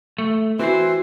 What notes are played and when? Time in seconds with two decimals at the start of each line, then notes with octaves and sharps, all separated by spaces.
0.18 A3
0.59 E3 C4 F#4 C5